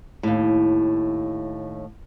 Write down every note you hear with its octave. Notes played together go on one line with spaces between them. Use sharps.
D#2 A2